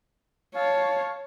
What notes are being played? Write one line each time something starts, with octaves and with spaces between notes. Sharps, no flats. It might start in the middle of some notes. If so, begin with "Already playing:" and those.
C#5 F5 A5